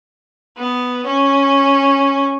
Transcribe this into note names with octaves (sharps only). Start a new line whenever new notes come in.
B3
C#4